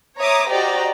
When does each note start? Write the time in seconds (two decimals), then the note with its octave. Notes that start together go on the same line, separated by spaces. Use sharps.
0.19 C#5 E5 A#5 D6 D#6
0.51 F#4 G4 C5 D5 D#5 A#5